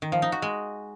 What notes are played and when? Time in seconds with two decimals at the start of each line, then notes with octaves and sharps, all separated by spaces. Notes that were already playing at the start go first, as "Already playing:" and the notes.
0.02 D#3
0.12 F3
0.22 D#4
0.32 F#4
0.42 G#3